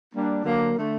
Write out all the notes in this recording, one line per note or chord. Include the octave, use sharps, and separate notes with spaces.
G3 A#3 D4
D3 F#3 A#3
D3 A3